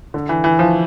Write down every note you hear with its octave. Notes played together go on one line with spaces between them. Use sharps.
D3
E3
E3
F3